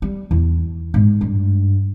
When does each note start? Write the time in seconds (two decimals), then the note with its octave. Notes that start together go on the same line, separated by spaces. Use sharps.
0.02 G3
0.31 E2
0.94 G#2
1.21 G2